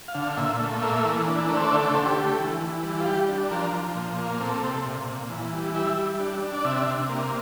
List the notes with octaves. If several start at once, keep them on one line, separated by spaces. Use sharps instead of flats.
F5
D3
F5
A#2 E5
A3
A#3 E5
E3
D4
A3 A#4
C5
D5
D3 E5
D5
D3 C5
G4
A3
E3
E3
G3
F4
G3 G4
D4
F3 A#4
F3
A#2
A#3
C4 A4
C3
A#2
A#2
E3
G3
G3 E5
G3
D4
D4
D5
C3 E5
C3
A#3